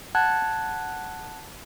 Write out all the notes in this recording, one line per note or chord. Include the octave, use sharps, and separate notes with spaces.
F#5 A5 F#6 G#6